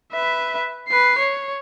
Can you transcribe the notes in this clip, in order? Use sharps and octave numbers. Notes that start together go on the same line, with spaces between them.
B4 E5
B4 C7
C#5